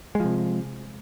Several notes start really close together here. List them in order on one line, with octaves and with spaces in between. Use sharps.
G#3 F3 C3